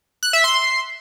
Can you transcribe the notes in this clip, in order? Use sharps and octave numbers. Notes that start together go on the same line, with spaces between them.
F#6
E5
C6